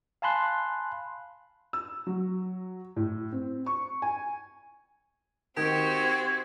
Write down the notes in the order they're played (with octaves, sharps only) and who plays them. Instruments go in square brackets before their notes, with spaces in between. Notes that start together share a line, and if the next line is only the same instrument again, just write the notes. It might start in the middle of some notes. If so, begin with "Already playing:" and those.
[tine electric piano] F5 G#5 A5 B5 C6 F#6
[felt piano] E6
F#3
A2
C4
C#6
G#5
[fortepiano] D#3 [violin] C4 F#4 [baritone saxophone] G4 [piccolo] G#6